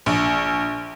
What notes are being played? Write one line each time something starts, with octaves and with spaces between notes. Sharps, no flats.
A#1